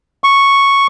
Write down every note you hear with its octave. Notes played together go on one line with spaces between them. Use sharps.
C#6